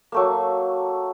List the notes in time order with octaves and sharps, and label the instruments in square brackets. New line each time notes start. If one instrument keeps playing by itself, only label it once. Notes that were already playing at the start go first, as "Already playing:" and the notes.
[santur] F#3 A3 A#3